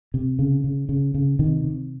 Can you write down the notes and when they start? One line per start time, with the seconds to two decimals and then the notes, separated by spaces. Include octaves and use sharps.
0.14 C3
0.39 C#3
0.64 C#3
0.89 C#3
1.14 C#3
1.39 C3 D#3
1.64 C3